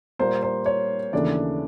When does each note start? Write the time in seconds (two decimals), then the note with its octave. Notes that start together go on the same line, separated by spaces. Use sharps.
0.19 A#2 G3 A#3 C5
0.43 C5
0.66 C#5
1.13 D#2 C#3 E3 A3 D4 D5